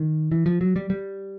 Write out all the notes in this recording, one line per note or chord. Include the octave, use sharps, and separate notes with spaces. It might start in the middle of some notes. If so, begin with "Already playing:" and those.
Already playing: D#3
E3
F3
F#3
G3
G3